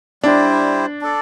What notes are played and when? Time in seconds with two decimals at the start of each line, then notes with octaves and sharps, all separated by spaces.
0.23 G3 D4 E4 G4 C5
1.01 D4 A4 D5